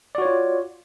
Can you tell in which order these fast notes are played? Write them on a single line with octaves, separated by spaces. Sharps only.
D5 F#4 C#5 F4